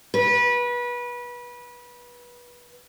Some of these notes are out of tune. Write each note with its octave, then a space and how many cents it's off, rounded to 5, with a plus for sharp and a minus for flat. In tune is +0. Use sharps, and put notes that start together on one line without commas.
B4 -25